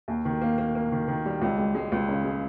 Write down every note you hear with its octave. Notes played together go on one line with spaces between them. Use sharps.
D#2
D#3
A#3
A#3
A#3
D#3
D#3
G3
C#2
G#3
G#3
C#2
C#3
G#3